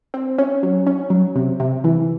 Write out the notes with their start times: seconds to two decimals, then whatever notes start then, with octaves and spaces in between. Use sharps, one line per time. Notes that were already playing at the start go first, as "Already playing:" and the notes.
0.14 C4
0.38 C#4
0.63 F#3
0.87 C#4
1.10 F#3
1.36 C3
1.60 C3
1.84 E3